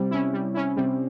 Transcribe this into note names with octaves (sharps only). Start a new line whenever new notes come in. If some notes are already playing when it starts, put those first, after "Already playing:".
Already playing: C3 G3 C4
C#4 E4
G3
C#4 E4
C3 G3 C4